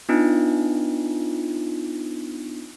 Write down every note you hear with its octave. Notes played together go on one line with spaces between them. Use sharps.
B3 D4 D#4 F4